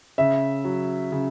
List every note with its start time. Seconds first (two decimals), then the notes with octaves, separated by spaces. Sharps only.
0.18 C#3 E5
0.65 F#3
1.12 C#3